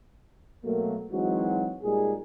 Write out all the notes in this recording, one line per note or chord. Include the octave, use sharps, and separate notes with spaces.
B2 F#3 A3 A#3
E3 F#3 G#3 C4 D#4 F#4
A#2 G3 G#3 D#4 G#4